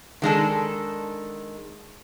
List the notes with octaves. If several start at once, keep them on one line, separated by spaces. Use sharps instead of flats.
D#3 G#3 D4 A4